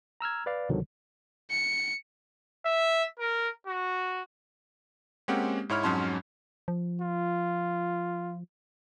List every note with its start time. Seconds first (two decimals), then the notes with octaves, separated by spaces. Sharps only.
0.21 A#5 E6 F6 G#6
0.46 B4 D5 F5
0.69 C2 B2 D3 D#3 F3 F#3
1.51 C#7
2.66 E5
3.19 A#4
3.67 F#4
5.28 G#3 A#3 C4 C#4 G4 F#5
5.69 G#2 E4 C#5 B5 F6
5.83 F2 G#2 F#3 C#4 A5 C6
6.68 F3
7.01 F4